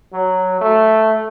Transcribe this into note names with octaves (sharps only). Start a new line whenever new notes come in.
F#3
A3